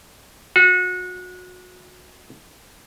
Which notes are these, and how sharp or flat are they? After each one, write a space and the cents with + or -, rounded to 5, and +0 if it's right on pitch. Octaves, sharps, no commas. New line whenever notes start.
F#4 -30